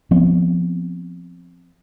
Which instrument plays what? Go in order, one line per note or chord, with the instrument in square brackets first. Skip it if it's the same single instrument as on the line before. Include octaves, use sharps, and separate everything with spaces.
[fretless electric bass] F3 B3 C4